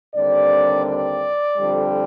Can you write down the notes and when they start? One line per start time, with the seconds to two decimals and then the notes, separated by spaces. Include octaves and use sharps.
0.15 D#2 D3 G3 C4 D5
0.87 D5
1.57 F2 D3 G3